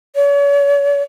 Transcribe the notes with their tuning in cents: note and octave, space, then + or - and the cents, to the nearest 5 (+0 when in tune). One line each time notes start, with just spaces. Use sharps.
C#5 +40